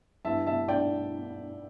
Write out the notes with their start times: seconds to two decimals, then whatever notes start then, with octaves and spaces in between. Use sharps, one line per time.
0.25 G2 E3 G3 E5 A5
0.46 E5 A5
0.68 D5 G5